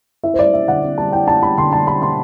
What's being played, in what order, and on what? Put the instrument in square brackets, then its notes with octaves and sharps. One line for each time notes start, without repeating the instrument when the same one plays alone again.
[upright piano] E4 E5
C5
G3 D5
E4 E5
D3 F#5
C4
G3 A5
E4 G5
E4 A5
G3 B5
D3 C6
G3 A5
G3 B5
D3 C6